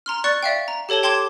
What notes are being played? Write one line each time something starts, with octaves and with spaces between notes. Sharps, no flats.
A#5 C6 F6
D5 C#6 F#6 A6 C#7
D5 E5 F5 G5
A#5
G4 A4 C#5 A5 G7
G5 A5 C6 D6 G#6 E7